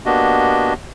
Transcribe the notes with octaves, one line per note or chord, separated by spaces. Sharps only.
A#3 B3 D4 F#4 G4 D#5